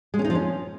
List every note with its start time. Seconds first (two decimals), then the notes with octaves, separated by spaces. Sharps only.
0.14 G#3
0.19 C#4
0.24 D#4
0.30 F3
0.35 C#4